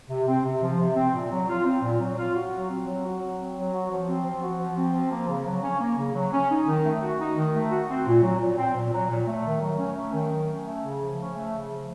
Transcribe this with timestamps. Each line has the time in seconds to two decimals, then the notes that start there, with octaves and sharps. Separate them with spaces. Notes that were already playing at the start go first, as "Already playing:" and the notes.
0.10 C3
0.28 C4
0.44 C3
0.63 F3
0.80 C3
0.96 C4
1.14 A#2
1.31 F#3
1.49 F4
1.65 C4
1.83 A#2
2.01 F#3
2.18 F4
2.34 F#4
2.52 F#3
2.70 C4
2.87 F#3
3.04 F#4
3.22 F#3
3.38 C4
3.56 F#3
3.73 F#4
3.91 F3
4.09 C4
4.26 F3
4.43 F#4
4.60 F3
4.77 C4
4.95 F3
5.11 A#3
5.28 C#3
5.46 F#3
5.63 C#4
5.81 A#3
5.98 C#3
6.15 F#3
6.33 C#4
6.50 D#4
6.68 D#3
6.85 A3
7.02 F#4
7.19 D#4
7.37 D#3
7.54 A3
7.71 F#4
7.88 C4
8.06 A#2
8.23 F#3
8.40 A#2
8.58 C4
8.74 A#2
8.93 F#3
9.10 A#2
9.27 A3
9.44 D#3
9.61 F#3
9.79 C#4
9.96 A3
10.13 D#3
10.31 F#3
10.48 C#4
10.64 A3
10.83 C#3
11.00 F3
11.18 C#4
11.35 A3
11.51 C#3
11.69 F3